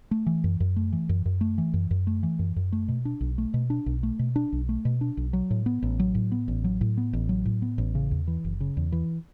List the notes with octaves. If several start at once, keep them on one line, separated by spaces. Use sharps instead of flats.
A3
E3
F#2
F#2
A3
E3
F#2
F#2
A3
E3
F#2
F#2
A3
E3
F#2
F#2
A3
B2
D4
B1
A3
B2
D4
B1
A3
B2
D4
B1
A3
B2
D4
B1
F#3
A2
B3
A1
F#3
A2
B3
A1
F#3
A2
B3
A1
F#3
A2
B3
A1
C#3
E2
E3
F#1
C#3
E2
E3